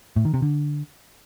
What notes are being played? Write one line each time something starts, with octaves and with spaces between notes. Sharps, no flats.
A2
D#3
C3
D3